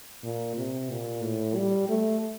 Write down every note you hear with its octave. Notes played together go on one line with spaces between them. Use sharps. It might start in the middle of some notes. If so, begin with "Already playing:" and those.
A#2
C3
A#2
A2
G3
A3